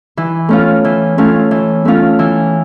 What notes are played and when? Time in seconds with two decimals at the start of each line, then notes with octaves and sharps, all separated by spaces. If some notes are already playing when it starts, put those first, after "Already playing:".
0.17 E3
0.49 A3 C#4 F4
0.85 E3
1.18 A3 C#4 F4
1.51 E3
1.85 A3 C#4 F4
2.19 E3